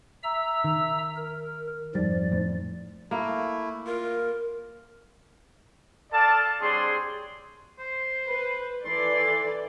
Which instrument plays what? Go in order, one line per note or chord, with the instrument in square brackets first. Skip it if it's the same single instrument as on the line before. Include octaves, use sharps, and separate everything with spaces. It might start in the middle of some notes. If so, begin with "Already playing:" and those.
[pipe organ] E5 A#5 E6
[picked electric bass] D#3
[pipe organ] A#4
[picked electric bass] F2 G3 [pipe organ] G#2 F3 D5
[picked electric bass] F2 A2
[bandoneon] A3 E4 [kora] A#3
[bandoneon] F4 [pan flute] A#4
[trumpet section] A4 D5 F5 A5
G3 C4 D4 G#4 C#5 C6
[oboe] C5
[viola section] B4
[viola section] E3 A4 D5 [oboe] C6